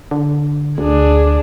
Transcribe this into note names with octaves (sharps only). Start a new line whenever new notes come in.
D3
D2 D4 G#4